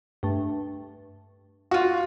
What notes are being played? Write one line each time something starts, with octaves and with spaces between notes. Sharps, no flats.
G2 A3
F4 F#4